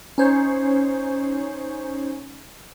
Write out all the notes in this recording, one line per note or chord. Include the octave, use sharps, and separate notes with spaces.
C#4 D#4 C5 C#5